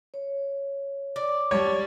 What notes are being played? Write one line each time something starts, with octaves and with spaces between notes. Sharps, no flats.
C#5
D5
G3 C#5 A5